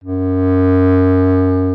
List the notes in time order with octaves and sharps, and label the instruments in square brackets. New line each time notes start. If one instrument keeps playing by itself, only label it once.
[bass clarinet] F#2